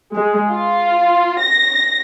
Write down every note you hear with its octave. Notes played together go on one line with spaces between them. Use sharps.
G#3
F4
A#6